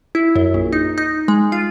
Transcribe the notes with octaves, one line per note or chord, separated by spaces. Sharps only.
E4
F#2
A#1
D#4
D#4
G#3
F4